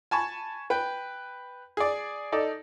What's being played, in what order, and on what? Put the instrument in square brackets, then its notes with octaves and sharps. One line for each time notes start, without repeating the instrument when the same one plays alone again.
[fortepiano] G#5 A5 B5 C#6
B4 G5
G#4 D5
D#4 A4 D5